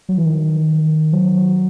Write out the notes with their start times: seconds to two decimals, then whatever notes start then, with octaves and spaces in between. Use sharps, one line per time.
0.09 F#3
0.18 E3
0.26 D#3
1.13 F#3